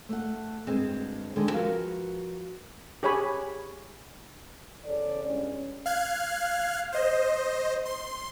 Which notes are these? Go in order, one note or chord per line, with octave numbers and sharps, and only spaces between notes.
A3 F#5
D2 G2 G#3 C4 G#4
D3 D#3 G#3
F3 F#4 A#4 B4 F5
G4 G#4 C#5 G#5 B5
E2 C#3 A4 C#5 D5
E2 G2 G#3 C#4
F5 F6 F#6 G#6
C5 D#5
C6